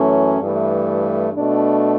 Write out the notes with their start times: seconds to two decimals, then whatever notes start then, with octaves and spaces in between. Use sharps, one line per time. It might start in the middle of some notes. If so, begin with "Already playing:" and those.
Already playing: F#2 E3 A3 C#4
0.40 G2 E3 A3
1.33 B2 A3 D4